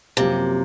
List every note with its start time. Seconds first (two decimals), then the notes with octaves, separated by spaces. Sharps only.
0.17 F#2 C3 F3 A#3